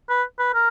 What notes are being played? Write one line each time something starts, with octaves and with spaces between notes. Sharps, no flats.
B4
B4
A#4